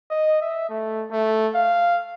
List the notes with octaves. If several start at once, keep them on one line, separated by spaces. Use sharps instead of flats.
D#5
E5
A3
A3
F5